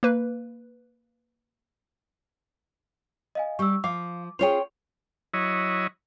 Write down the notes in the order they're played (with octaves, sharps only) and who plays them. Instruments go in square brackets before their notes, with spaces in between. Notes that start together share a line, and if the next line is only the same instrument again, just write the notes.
[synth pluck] A#3 B4
[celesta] D#5 F5 G#5
[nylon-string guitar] G3 G4 [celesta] C#6 E6
[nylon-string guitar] F3 [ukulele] F5 [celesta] D6
[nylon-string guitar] C#4 F4 G#4 [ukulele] C5 C#5 G5 [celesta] F7
[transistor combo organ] F#3 E4 C#5 D#5